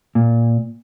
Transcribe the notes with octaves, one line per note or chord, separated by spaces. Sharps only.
A#2